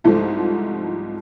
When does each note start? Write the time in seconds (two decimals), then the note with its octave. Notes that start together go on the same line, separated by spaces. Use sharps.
0.04 C2 G#2 F3 A3